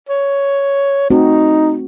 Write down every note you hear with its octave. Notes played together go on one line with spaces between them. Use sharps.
C#5
A3 C4 D#4 F#4